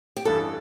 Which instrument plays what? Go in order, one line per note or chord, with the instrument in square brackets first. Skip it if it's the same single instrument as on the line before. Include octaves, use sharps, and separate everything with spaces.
[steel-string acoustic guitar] G4
[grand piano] A1 G2 E3 [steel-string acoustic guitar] A4